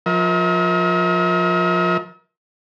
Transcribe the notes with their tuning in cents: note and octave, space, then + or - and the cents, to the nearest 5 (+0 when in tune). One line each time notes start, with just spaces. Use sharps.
F3 +20 A#4 +30 E5 -45